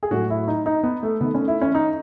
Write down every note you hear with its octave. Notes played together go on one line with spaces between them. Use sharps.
G#4
A2 F#3 A3 F#4
E4
D#4
D#4
B3
A3
D#3 A3 B3
C#4
E4
C#4
D#4